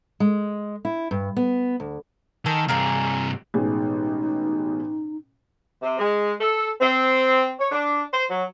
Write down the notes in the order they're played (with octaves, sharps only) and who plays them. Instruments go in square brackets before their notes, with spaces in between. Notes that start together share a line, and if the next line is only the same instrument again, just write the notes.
[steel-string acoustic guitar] G#3
E4
G2
B3
D2
[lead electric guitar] D#3 [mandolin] A4 A#4 G#5
[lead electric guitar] G2 C3 [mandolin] G#4 A#4 F5
[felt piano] A1 B2 G#3 [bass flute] D#4
[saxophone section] C3
G#3
A4
C4
C#5
D4
C5
F#3